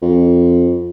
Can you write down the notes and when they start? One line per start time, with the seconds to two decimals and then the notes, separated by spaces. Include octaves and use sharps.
0.02 F2